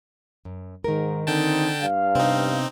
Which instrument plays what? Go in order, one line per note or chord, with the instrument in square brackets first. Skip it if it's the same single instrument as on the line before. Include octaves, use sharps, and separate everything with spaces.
[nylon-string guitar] F#2
[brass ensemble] G#2 [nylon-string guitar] D#3 A#4
[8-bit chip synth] D3 G5 A5 [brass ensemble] C4 D#4
[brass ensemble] G2 F5
[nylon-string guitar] C3 B3 D4 [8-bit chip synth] C4 D#4